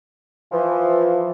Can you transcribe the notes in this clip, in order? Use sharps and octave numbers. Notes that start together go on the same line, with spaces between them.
E3 F3